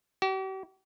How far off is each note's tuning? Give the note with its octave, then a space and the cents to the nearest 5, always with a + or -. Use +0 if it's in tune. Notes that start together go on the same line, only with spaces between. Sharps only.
G4 -45